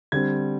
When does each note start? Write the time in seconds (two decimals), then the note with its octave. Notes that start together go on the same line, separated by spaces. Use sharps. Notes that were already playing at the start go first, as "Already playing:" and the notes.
0.12 D3 G3 C4 G#6